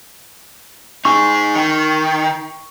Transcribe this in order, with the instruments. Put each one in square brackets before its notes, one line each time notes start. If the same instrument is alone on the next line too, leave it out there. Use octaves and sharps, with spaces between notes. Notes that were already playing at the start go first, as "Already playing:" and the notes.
[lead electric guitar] D#4 G#4 [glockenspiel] C#6
[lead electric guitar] D#3